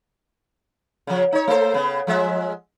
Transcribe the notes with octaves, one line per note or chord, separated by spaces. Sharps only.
C#3 F3
D#4 C#5
A3 A4 C5
C#3 B3
F3 G#3 E5